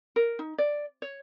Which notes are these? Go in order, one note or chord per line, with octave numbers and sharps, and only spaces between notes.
A#4
D#4
D5
C#5